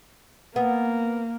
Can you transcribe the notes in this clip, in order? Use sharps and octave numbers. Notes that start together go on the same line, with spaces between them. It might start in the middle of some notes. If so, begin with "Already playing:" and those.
A#3 B3